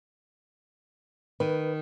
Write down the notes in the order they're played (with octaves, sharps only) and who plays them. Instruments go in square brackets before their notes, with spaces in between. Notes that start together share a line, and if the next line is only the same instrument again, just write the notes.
[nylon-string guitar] D#3 [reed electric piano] B4